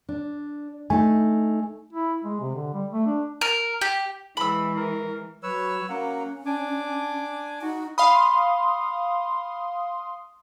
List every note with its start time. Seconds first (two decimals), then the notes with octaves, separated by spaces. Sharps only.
0.09 D4
0.90 A3 D#4 G#5
1.93 E4
2.24 G#3
2.41 C3
2.55 D3
2.73 G3
2.93 A3
3.06 D4
3.41 A#4
3.81 G4
4.37 E3 G#3 B5 E6
4.77 A#4
5.43 F#3 B4 C#5 E6
5.89 F#3 A#3 C#4 F#5
6.46 D4 G#5 D6
7.62 D#4 F#4
7.98 F5 B5 C6 D#6